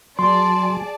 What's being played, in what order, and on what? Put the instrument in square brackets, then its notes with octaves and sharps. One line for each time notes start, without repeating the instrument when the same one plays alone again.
[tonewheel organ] F#3 [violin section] G#4 D5 A5 [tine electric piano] C6